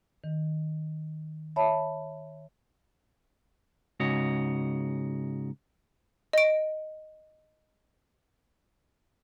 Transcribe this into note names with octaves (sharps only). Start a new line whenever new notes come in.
D#3
C#5 E5 A5 B5
G#2 C#3 F#4 C#5 D#5
D#5 D7